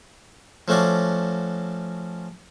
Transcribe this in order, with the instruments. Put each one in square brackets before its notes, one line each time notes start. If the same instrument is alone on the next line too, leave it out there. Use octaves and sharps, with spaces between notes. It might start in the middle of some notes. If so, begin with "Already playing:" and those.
[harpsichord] F3 A3 C#4 F#4 D5